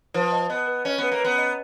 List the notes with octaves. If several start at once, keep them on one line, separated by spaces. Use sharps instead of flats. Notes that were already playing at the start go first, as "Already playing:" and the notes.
F3 B4
D#5
B3 D#5
B4
C#4 D#5
B3 B4
A#3
B3 B4
D#5